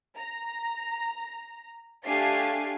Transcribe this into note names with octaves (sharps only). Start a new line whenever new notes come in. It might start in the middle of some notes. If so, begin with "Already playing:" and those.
A#5
A3 D4 G4 F5 G#5 C7